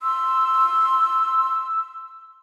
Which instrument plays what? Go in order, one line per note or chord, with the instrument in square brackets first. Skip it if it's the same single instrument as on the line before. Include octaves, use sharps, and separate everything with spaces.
[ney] C6 [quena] E6